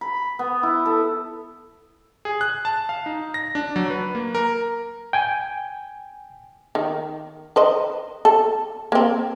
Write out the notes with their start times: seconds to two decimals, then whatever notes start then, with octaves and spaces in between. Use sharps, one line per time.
0.01 B5
0.39 B3
0.63 E4
0.85 A4
2.25 G#4
2.41 F#6
2.65 A5
2.89 F5
3.06 D#4
3.34 A#6
3.55 D4
3.76 F#3
3.90 B4
4.15 A#3
4.35 A#4
5.13 G5 G#5
6.75 D#3
7.56 B4 C5 D#5
8.25 A4
8.92 A#3 C4